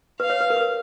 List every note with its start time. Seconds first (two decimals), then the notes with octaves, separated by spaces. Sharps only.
0.20 B4 F5
0.30 C#5
0.41 B4
0.50 A#4
0.56 B4
0.61 A#4